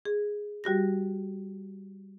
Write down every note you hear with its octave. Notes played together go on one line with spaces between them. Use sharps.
G#4
G3 F#4 G4 A#6